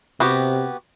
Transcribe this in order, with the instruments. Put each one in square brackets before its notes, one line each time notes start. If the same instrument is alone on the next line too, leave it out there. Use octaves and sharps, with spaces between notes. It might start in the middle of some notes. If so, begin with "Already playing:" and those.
[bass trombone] C3 [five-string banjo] B3 F#4 G4